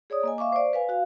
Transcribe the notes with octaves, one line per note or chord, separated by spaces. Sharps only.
G#4 C#5 D5 D#6
A#3 D#5 G#5
E5 F5 C#6 D6
C5 D5
B4 F5 G#5
F#4 F5